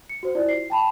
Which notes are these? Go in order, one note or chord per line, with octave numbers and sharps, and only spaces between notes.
C#7
F#4 C5
E4 F4 D5
C7
G5 A5 B5